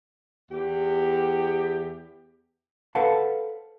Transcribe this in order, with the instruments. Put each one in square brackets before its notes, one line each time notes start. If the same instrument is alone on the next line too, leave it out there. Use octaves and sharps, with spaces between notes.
[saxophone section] E2 G4
[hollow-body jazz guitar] A4 B4 C5 F5 F#5 A5